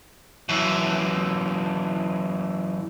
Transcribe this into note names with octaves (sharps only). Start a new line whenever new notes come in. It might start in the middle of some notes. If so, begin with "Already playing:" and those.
F#2 E3